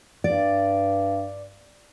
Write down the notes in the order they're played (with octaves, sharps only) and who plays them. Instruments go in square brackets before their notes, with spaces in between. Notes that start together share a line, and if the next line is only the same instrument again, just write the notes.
[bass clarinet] G2 [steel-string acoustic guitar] D5